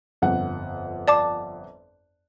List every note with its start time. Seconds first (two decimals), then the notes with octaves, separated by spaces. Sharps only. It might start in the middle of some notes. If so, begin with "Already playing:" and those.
0.22 G1 F2 F#5
1.08 D5 A5 D6